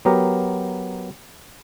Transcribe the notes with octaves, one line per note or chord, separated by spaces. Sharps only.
F#3 B3 G4 A#4